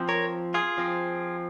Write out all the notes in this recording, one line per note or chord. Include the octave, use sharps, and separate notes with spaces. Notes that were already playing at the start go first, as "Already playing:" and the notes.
Already playing: F3 C4
A#4 C#5
F4 G#4
F3 C4